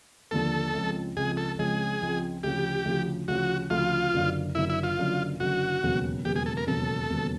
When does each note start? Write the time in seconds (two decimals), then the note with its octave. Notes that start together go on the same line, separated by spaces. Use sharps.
0.31 D#2 D3 F3 A#3 A4
0.74 C#2 C#3 F3 G#3 C4
1.16 C#2 C#3 F3 G#3 C4 G#4
1.37 A4
1.59 C#2 C#3 F3 G#3 C4 G#4
2.01 C#2 C#3 F3 G#3 C4
2.43 D2 C#3 F3 G4
2.85 D2 C#3 F3
3.28 D2 C#3 F3 F#4
3.70 D2 C#3 F3 F4
4.14 F#1 F#2 D3
4.55 F#1 F#2 D3 E4
4.70 E4
4.83 F4
4.98 F#1 F#2 D3
5.40 F#1 F#2 D3 F#4
5.83 E1 D#2 C#3 F#3 B3
6.25 E1 D#2 C#3 F#3 B3 G4
6.36 G#4
6.46 A4
6.57 A#4
6.67 E1 D#2 C#3 F#3 B3 A4
7.10 E1 D#2 C#3 F#3 B3